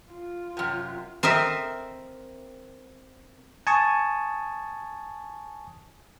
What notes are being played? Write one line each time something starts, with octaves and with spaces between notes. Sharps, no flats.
F4
F#2 C3
C4 A#4 D#5 E5
G#5 A5 C#6 D#6